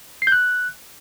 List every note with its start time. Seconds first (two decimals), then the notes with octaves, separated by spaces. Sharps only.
0.22 C7
0.27 G6
0.32 F#6